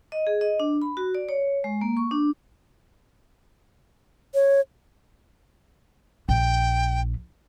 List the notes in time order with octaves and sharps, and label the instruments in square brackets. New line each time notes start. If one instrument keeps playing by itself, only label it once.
[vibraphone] D#5
G#4
D#5
D4
B5
F#4
D5
C#5
G#3
A#3
C#6
D4
[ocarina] C#5
[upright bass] A#1 [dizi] G5